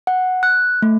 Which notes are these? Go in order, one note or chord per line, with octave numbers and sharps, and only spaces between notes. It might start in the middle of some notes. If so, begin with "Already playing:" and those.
F#5
F#6
A3